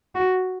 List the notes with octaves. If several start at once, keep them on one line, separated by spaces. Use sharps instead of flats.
F#4